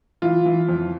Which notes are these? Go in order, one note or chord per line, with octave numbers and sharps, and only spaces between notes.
E3 F4
E3
F2